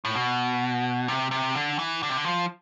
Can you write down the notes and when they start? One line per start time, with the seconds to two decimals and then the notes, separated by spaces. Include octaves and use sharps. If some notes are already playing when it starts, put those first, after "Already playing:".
0.05 A2
0.15 B2
1.08 C3
1.31 C3
1.55 D3
1.79 E3
2.03 D3
2.10 C3
2.17 D3
2.26 F3